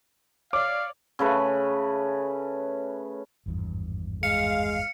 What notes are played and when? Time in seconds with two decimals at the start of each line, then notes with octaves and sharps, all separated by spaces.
0.53 C#5 D5 F5 D6
1.19 C#3 A3 B4
3.46 G#1 E2 G2
4.23 G#3 F5 C#7